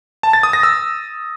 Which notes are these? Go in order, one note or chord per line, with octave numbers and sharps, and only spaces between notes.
A5
A6
D#6
A#6
E6